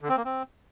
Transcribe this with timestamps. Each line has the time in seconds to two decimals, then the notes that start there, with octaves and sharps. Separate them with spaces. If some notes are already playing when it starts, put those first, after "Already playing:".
0.01 D3
0.09 C4
0.17 A#3
0.25 C4